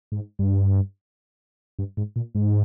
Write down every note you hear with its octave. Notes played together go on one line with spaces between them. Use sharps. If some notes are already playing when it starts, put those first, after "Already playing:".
G#2
G2
G2
G#2
A#2
G#2